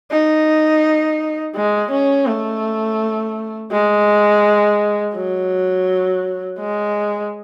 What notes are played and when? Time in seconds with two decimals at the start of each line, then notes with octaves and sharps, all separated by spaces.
0.11 D#4
1.55 G#3
1.92 C#4
2.26 A3
3.71 G#3
5.15 F#3
6.59 G#3